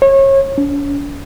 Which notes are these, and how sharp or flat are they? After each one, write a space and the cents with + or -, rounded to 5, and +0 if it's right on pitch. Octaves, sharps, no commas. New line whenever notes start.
C#5 -30
C#4 +45